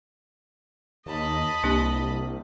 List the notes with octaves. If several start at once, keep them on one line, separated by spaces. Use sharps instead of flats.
D#2 D#5 A5 B5
C2 A#3 D4 G4